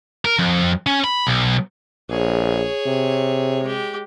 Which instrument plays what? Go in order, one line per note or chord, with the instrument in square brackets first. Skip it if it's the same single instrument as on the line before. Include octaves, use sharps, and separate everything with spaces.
[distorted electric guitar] A#4
F2
C#4
B5
B1
[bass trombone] A#1 [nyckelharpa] G#4 C#5
[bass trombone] C3
[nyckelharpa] G#3 G4